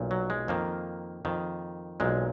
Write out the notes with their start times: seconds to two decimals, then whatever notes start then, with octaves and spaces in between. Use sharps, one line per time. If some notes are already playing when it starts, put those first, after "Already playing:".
Already playing: B1 A#2
0.11 F#3
0.30 G#3
0.48 F2 D#3 A#3
1.25 F2 D#3
2.00 B1 A#2 G#3